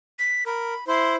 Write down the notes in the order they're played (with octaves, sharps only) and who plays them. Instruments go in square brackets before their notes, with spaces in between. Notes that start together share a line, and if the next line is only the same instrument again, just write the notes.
[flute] B6
[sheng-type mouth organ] A#4 [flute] B5
[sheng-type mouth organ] E4 C5 [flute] C6